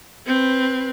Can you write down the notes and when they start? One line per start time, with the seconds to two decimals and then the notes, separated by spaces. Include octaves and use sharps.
0.27 C4 B4